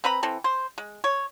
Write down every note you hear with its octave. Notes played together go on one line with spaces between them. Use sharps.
C4 B4 A#5 B5
E3 C4 A4
C5
G#3
C#5